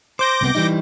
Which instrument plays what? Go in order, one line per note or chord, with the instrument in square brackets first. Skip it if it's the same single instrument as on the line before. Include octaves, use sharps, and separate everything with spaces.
[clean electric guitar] C5 [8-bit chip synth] D6 G6 A#6
[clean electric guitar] C2 C3 B3
E3 G3 D#4